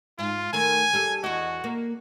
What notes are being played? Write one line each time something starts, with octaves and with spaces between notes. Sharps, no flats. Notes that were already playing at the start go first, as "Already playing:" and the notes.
G#2 F4
D#3 A3 A#4 G#5
G3 G#4 A4
E2 F#4 D#5
A#3